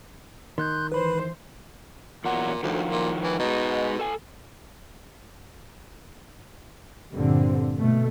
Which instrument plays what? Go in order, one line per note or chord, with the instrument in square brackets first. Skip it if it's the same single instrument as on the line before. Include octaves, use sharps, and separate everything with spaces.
[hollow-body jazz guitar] D#3 [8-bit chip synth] C6 F#6 G6
[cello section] E3 C5 [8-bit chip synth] B4 B5
[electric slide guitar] E2 F#3 F#5 [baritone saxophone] A#2
[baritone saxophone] D2 [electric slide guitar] D#3 F3 F#3
[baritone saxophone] A#2
E3
[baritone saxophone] B2 [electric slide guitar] G#3 D#4
[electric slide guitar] A4 G#5
[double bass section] A#1 G2 A#2 D3 C4
B2 A3